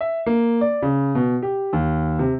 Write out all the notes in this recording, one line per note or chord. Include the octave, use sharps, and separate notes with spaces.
E5
A#3
D5
C#3
B2
G4
D#2
C3